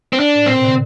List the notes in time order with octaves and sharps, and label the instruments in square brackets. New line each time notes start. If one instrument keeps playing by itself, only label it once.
[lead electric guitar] C4
D4
[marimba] A2
[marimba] A#2 [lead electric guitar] C4
[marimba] C3
D3